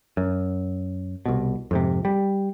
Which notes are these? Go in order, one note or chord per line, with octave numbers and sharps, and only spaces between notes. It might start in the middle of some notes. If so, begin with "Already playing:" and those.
F#2
C2 B2
F2 G#2 C3
G3